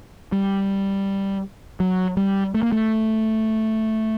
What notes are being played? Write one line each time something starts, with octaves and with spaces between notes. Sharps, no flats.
G3
F#3
G3
A3
A#3
A3